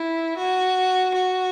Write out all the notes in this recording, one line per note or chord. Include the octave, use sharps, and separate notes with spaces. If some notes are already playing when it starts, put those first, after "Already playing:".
Already playing: E4
F#4
F#4